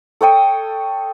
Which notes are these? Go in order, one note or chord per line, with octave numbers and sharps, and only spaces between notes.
A4 C#5 G5 D#6